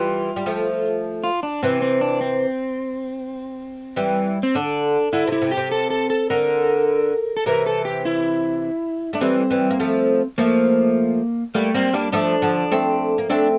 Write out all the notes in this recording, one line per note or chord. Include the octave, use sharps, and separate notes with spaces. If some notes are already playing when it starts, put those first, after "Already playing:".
Already playing: E3 G3 F4
G3
F3 A3
F4
D4
C3 E3 C4
C4
D4
C4
E3 G3
C4
D3 D4
D3 E4
C3 E4
C3
G4
C3
A4
A4
A4
D3 A#4
A4
C3 E3 A#4
A4
G4
E4
A3 D4
E3 G3 C4
E3 G3
A#3
F3 A3
F3 A3 A#3
G3 A3 A#3
G3 A#3 C4
G3 A#3 D4
F3 A3 D4
D3 F3
A3 C4
A#3
A3 C4 D4